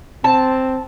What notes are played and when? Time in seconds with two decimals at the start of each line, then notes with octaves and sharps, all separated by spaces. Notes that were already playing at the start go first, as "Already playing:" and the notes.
0.24 C4 A5